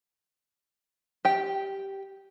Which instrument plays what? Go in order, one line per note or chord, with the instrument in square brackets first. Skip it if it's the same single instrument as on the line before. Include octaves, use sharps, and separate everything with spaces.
[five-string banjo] G4 G5